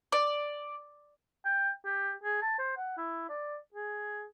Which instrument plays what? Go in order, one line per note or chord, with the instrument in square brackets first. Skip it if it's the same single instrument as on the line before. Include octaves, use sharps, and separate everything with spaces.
[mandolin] D5
[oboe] G5
G4
G#4
A5
C5
F#5
E4
D5
G#4